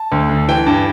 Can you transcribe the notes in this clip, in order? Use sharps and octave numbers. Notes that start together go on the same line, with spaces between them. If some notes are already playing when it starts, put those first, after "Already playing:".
Already playing: A5
D2
D3
E3 G5
G2